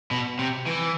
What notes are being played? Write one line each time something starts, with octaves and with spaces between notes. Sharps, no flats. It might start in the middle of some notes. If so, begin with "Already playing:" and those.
B2
C3
E3